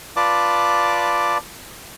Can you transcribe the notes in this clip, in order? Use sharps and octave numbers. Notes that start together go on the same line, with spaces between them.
F4 B4 D5 A5 D6